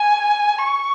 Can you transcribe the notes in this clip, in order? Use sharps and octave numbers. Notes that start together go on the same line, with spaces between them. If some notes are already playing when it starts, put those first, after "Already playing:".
Already playing: G#5
C#6